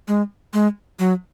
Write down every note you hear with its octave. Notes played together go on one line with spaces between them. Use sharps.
G#3
G#3
F#3